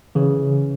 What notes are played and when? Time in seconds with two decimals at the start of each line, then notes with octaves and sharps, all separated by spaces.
0.15 C#3 E3